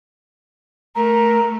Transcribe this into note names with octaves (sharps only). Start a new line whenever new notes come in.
A3 A#4 A#5